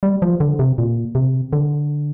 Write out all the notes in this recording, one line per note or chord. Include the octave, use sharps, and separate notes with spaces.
G3
F3
D3
C3
A#2
C3
D3